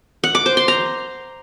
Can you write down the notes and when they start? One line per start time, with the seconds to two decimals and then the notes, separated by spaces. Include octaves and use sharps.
0.24 F#5
0.35 D6
0.46 C5
0.57 C6
0.68 A#5